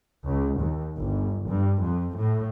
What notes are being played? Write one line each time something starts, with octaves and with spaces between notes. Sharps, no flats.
C#2
D#2
G1
G2
F2
A2